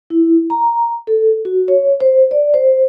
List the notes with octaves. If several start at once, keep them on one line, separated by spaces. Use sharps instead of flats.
E4
A#5
A4
F#4
C#5
C5
D5
C5